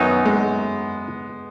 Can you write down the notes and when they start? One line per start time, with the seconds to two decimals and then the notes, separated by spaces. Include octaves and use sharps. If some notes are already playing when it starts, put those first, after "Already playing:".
Already playing: F#2 D#3 F#3 B3 D#4
0.25 G#3